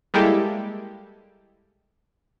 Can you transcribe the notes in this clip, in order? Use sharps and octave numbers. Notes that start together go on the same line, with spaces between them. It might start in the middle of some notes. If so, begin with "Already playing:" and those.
G3 G#3 A#3 E4 G4 A4